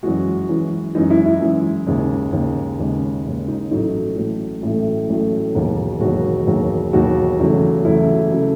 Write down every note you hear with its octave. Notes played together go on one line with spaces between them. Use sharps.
F#2 E3 G#3 F#4
F#2 E3 G#3
F#2 E3 G#3 D#4
E4
E4
F#2 E3 G#3
D#2 C#3 G#3
D#2 C#3 G#3
D#2 C#3 G#3
D#2 C#3 G#3
D#4
A1 A2 F#3 A3 D#4
A1 A2 F#3 A3
A1 A2 F#3 A3 E4
A1 A2 F#3 A3
E1 D#2 D#3 F#3
E1 D#2 D#3 F#3 F#4
E1 D#2 D#3 F#3
E1 D#2 D#3 F#3 F#4
E2 C#3 F#3 A3
E2 C#3 F#3 A3 E4
C#3 F#3 A3